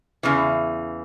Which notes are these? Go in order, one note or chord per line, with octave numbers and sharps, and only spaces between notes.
E2 C#3 E3